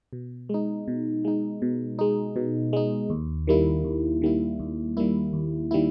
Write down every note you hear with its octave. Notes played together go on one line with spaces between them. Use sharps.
B2
G#3 D#4
B2
G#3 D#4
B2
G#3 D#4
B2
G#3 D#4
D#2
D#3 G3 A#3 E4
D#2
D#3 G3 A#3 E4
D#2
D#3 G3 A#3 E4
D#2
D#3 G3 A#3 E4